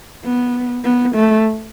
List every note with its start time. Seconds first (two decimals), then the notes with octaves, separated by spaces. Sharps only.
0.24 B3
0.84 B3
1.15 A3